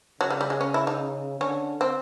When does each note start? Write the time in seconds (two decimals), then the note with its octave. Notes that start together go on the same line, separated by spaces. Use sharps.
0.21 C#3 F#3
0.30 G3
0.41 G3
0.50 G#3
0.61 C#4
0.74 E4
0.87 D#4
1.40 D3 C#4
1.81 C4